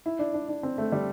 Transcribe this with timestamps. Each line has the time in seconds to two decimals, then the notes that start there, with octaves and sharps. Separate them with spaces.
0.06 E4
0.19 D4
0.34 D4
0.49 D4
0.63 C4
0.78 A3
0.92 G3